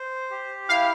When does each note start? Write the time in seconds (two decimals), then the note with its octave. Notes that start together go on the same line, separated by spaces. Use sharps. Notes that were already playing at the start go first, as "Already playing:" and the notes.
Already playing: C5
0.31 G4
0.69 E4 F5